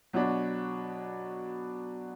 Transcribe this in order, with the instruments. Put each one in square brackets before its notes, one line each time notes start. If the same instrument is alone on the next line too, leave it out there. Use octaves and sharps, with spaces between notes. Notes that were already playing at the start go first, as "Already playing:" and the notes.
[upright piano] B2 F#3 B3 D4